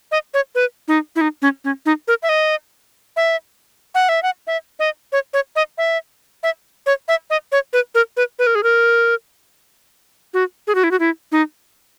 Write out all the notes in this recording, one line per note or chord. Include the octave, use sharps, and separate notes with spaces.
D#5
C#5
B4
D#4
E4
D#4
C#4
C#4
D#4
A#4
E5
D#5
E5
F#5
E5
F#5
E5
D#5
C#5
C#5
D#5
E5
E5
C#5
E5
D#5
C#5
B4
A#4
B4
B4
A#4
G#4
A#4
F#4
G#4
F#4
E4
F#4
E4
D#4